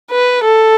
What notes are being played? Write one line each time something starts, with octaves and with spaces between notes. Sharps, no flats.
B4
A4